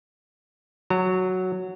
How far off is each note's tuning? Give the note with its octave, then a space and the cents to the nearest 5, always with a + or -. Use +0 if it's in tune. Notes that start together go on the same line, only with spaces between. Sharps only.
F#3 +0 A#5 -30